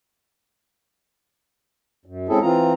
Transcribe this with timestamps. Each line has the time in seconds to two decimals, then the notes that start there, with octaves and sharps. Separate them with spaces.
2.06 F#2
2.29 G#3 C4 C#4 E4 G#4 A4
2.42 E3 C4 F4 A#5